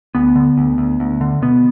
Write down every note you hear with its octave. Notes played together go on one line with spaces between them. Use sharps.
D2 B3
D3
D2
D2
D2
D3
B2 B3